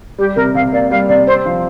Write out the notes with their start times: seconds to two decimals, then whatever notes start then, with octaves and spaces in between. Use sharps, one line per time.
0.18 G3 G4
0.36 C3 A#4
0.54 C3 F5
0.72 A#3 D5
0.90 G3 F5
1.08 C3 D5
1.27 C4 C5
1.45 F3